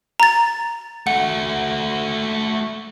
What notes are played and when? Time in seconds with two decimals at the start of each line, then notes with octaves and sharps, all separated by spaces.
0.20 A#5 A6
1.07 A3 F#4 F#5